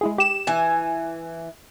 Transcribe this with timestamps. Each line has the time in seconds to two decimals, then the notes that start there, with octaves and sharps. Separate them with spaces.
0.01 G#3 E4 G#4
0.18 G4 E7
0.47 E3 G#5